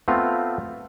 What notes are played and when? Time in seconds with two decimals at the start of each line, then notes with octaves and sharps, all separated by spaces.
0.08 A3 B3 C4 F4